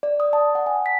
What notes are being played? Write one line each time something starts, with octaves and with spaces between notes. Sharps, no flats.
D5
D#6
A5
F#5
G#5
B6